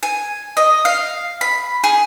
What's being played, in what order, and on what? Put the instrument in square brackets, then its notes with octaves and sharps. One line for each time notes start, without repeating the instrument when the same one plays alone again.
[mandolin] G#5
D#5
F5
B5
G#4